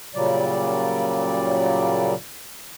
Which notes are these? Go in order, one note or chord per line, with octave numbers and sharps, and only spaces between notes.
A#2 C#3 F#3 G3 D5